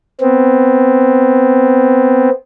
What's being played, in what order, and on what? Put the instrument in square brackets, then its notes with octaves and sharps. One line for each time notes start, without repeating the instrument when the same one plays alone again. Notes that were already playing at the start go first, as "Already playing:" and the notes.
[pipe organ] B3 C4